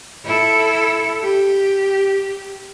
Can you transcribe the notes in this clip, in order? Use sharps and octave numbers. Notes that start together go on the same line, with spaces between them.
E4 A4
G4